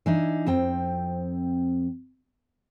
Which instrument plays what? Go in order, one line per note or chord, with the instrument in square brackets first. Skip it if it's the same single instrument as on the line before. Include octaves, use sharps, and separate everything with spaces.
[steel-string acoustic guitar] E3 D4 D#4
F2 C4 G5